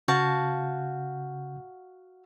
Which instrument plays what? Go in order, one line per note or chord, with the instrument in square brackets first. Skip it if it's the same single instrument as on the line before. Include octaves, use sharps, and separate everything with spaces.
[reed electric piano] C#3 G6 [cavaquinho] F#4 F5 A5